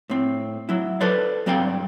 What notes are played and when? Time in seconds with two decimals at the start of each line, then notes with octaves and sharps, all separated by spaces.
0.10 A2 C4
0.69 F#3 E4
1.01 A4 B4 C5 D5
1.46 G2 F#3 C4 D5 F5 G5